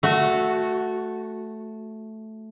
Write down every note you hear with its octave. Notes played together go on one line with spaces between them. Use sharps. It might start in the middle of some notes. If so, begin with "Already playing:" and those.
A3 F#4